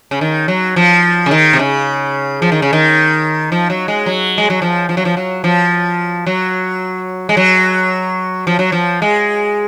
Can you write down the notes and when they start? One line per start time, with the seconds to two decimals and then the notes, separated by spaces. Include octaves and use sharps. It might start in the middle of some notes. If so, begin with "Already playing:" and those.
0.11 C#3
0.21 D#3
0.48 F#3
0.76 F3
1.26 C#3
1.31 D#3
1.53 C3
1.59 C#3
2.42 F3
2.52 D#3
2.62 C#3
2.73 D#3
3.52 F3
3.70 F#3
3.88 G#3
4.06 F#3
4.38 G#3
4.50 F#3
4.62 F3
4.89 F3
4.97 F#3
5.05 F3
5.17 F#3
5.44 F3
6.27 F#3
7.29 G#3
7.37 F#3
8.47 F3
8.59 F#3
8.72 F3
9.02 G#3